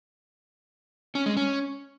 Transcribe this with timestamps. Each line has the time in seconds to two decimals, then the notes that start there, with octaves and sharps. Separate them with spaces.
1.15 C#4
1.26 G#3
1.37 C#4